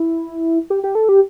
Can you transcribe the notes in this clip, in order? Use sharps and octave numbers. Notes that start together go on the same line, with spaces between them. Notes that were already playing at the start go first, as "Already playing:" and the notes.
Already playing: E4
G4
G4
A4
G4